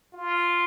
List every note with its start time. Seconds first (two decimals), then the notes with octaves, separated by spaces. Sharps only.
0.14 F4